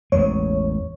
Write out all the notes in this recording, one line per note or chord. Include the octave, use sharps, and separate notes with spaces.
A1 E2 G#3 C#5